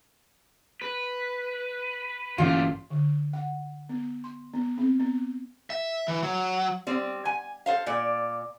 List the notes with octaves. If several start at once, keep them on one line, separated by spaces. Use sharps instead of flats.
B4
G1 A#2 E3 G3 A3 C#4 F4
D3
F#5
B3
C6
B3
C4
B3
E5
E3
F#3
G3 C4
G#5
A4 C5 F5
A#2 D5